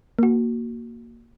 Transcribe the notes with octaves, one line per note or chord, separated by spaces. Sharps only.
A#3 F#4